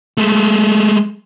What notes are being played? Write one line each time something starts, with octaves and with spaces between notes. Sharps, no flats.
G#3 A3